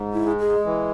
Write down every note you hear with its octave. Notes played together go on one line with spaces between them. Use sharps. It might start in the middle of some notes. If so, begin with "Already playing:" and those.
Already playing: G#2
E4
G#3
G#4
E3